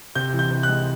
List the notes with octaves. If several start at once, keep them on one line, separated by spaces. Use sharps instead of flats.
C3 G6
E3
G6
C3
F#6
G#3